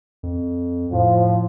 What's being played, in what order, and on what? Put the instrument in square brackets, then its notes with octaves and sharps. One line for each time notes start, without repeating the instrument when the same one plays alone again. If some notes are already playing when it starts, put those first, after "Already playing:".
[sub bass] F2
[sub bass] A2 [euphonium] F3